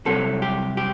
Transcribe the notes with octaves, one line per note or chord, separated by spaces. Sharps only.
C2 C3 F#3 A4
G4
G4